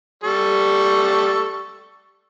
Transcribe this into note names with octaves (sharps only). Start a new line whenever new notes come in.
G3 A4 C#6